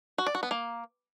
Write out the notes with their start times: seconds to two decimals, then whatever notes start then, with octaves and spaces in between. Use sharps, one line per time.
0.18 F#4
0.27 D5
0.35 F#4
0.43 B3
0.51 A#3